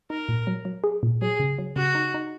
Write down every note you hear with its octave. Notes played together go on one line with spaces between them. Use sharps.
D#4 A#4
A#2
F#3
F#3
G#4
A#2
F#3 G#4
C#3
F#3
C#3 F#4
D#4
D#4